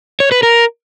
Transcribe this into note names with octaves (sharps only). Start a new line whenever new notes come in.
C#5
B4
A#4